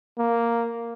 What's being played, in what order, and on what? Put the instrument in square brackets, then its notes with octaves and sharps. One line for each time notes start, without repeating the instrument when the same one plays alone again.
[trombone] A#3